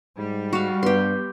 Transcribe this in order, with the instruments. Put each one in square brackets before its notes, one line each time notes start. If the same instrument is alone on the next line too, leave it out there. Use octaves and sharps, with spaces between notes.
[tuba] G#2 [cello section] G3
[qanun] F#4 F5
[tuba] G2 [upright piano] B3 [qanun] G4 C6